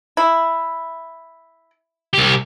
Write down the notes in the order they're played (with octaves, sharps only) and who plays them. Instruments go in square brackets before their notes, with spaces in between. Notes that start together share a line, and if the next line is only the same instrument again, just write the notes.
[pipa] E4
[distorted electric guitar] C2 G4